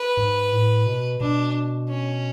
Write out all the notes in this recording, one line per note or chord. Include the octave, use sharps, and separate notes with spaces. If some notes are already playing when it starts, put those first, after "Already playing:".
Already playing: B4
G#2
A2
B2
B2 D4
C#4